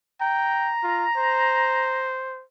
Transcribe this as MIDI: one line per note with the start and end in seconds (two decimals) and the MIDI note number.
0.21 0.72 79
0.21 2.14 82
0.83 1.06 65
1.16 2.43 72